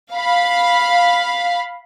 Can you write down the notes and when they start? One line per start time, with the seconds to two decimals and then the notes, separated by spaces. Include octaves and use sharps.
0.13 F5 B5